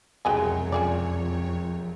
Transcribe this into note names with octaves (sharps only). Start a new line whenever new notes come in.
E1 C2 F2 F#3 G#3 G#4 C#5 G5
F3 C#4 G#4 D5